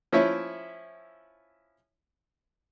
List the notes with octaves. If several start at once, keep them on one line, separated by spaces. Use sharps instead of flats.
F3 C#4 E4 C#5 E5